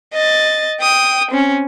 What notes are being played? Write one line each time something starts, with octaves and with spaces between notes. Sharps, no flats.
D#5 A6
G5 D#6
C4 C#4